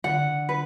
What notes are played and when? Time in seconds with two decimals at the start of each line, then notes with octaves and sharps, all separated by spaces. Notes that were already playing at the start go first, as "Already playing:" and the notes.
0.04 D3 F#5
0.49 B4